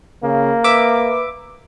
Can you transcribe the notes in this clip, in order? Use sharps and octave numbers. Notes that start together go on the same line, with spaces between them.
C#3 A#3
B4 E5 D6